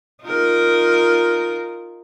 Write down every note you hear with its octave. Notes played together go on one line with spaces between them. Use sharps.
D#4 F4 A#4